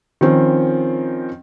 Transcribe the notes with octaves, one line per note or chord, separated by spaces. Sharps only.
D#3 F3 C4 C#4